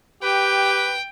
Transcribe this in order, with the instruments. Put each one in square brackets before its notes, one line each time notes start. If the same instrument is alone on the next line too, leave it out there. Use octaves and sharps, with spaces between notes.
[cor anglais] G4 [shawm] B4 [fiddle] G5